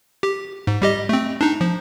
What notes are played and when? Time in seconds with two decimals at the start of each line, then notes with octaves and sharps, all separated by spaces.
0.23 G4
0.67 G#2
0.82 G3 G4 D#5
1.09 A3 C4
1.41 D4 D#4
1.61 F3